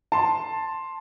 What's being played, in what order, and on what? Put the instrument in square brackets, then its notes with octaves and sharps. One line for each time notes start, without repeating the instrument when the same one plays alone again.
[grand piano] A5 C6